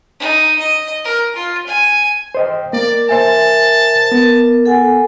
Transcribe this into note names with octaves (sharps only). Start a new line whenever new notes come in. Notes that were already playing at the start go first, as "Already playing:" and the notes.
D#4
D#5
A#4
F4
G#5
C5 D#5 G5
A#3 A#4 D5
C5 E5 G#5 A5
B3 A#4
A4 F#5 G#5